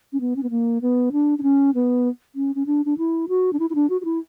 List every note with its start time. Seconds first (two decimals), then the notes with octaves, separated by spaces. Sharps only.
0.13 C#4
0.21 B3
0.36 C#4
0.43 B3
0.50 A#3
0.82 B3
1.12 D4
1.39 D4
1.43 C#4
1.75 B3
2.35 C#4
2.55 C#4
2.66 D4
2.85 D4
2.98 E4
3.29 F#4
3.53 D4
3.59 E4
3.70 E4
3.75 D4
3.90 F#4
4.01 F#4
4.05 E4